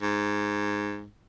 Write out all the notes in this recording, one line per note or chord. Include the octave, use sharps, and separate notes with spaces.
G#2